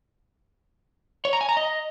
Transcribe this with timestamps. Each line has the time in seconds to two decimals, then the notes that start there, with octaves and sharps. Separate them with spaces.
1.25 C#5
1.33 A#5
1.41 G#5
1.49 A#5
1.57 D#5